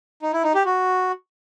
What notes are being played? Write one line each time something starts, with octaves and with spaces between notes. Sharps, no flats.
D#4
E4
D#4
G4
F#4